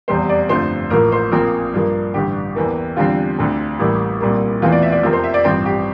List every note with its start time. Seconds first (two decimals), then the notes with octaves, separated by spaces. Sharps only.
0.08 F1 E2 C3 G3 C5
0.29 D5
0.49 G1 F2 D3 F3 A3 C5
0.90 A1 A2 F3 A#3 A#4
1.12 C5
1.31 A#1 A#2 F3 C4 A#4
1.73 G2 F3 A#3
2.14 A1 G2 D3 G4
2.55 E2 E3 A#3
2.96 E2 D3 G3 C4 F4
3.38 D2 D3 A3 C4
3.79 A1 A2 G3 A#3 E4
4.21 C2 A#2 G3 A#3
4.62 E1 E2 E3 A3 C4 F4
4.72 D5
4.82 E5
4.92 D5
5.03 F2 C3 F3 C4 A#4
5.13 C5
5.24 E5
5.34 D5
5.44 A1 G2 F3 C4 C5
5.65 G4